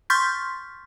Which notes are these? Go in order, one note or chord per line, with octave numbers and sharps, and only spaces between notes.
C6 C#6 F6 G6 A6 B6